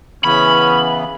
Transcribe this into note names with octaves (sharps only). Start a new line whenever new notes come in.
C#3 E3 B3 C#4 B5